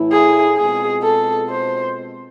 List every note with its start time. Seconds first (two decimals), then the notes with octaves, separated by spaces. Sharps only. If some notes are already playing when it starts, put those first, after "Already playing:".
Already playing: A2 E3 A3 E4
0.12 G#4
0.57 B2 G#3 C4 F4 G#4
1.03 A4
1.49 C5